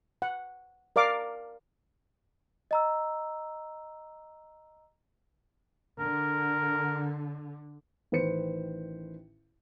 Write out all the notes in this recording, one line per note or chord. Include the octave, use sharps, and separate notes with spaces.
F#5
A#4 D5 F5 D6
D#5 A#5 E6
D3 A#4
A1 D#3 B4 C5 C#7